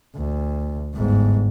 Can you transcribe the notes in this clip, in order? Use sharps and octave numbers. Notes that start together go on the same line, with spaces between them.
D2
G1 G#2